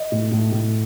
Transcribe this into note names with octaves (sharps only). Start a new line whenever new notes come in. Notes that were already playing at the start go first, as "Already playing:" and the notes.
Already playing: D#5
A2
A2
A2